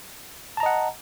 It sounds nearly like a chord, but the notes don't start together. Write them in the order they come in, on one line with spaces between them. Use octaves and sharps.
A5 A#5 D#5 F#5